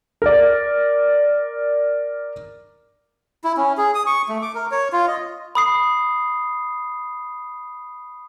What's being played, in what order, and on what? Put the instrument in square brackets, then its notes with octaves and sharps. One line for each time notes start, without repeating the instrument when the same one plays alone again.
[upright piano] A#4 D5
[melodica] E4
C#4
G#4
D#6
C#6
A3
D6
A#4
C#5
F4
D#5
[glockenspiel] B5 D#6 C7